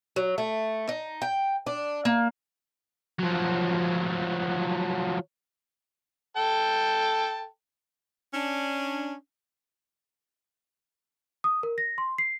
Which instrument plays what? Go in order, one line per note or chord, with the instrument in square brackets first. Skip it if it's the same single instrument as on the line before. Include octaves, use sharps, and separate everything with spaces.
[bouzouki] F#3
A3
D#4
G5
D4
A#3
[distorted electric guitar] F3 F#3
[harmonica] A4 G5 A5
[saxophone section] C#4 D4
[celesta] D#6
A#4
A#6
C6
C7